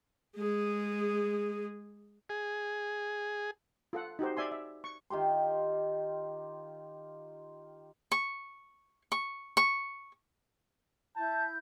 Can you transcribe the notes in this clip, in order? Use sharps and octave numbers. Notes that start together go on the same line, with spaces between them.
G#3 G#4
G#4
F4 A4 F#5
D#4 F#4 G4 C5
D5 E5 G#5 C6
E5
C#6
D#3 F4 G4 C6
C#6
C#6
C#6
E4 A5 G6